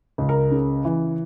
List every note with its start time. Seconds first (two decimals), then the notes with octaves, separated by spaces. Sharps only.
0.18 C#2
0.29 A#4
0.51 C#3
0.85 E3